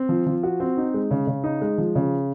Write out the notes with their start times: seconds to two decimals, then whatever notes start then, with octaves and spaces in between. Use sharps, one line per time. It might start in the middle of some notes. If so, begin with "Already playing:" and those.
Already playing: C4
0.09 F3
0.26 F3
0.43 F#4
0.60 C4
0.77 D#4
0.94 G#3
1.11 C#3
1.27 C#3
1.44 D#4
1.61 G#3
1.78 F3
1.95 C#3